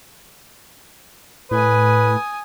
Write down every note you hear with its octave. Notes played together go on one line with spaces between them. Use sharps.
A2 B4 G#5 D#6